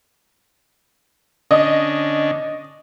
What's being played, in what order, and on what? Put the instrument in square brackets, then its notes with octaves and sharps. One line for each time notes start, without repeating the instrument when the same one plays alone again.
[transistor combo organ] D3 C#4 D4 [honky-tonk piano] D#5